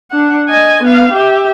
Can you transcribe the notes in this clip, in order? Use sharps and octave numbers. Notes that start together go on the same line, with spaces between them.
D4 F#5
D#5 G#5
B3 F5
G4 E5